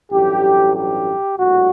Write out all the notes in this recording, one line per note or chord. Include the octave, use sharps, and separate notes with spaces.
A1 G2 F#3 A3 G4
G4
A#1 A2 G3 F#4